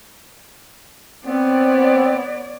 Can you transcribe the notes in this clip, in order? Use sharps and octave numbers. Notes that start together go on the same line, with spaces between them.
B3 C4 C#5 D5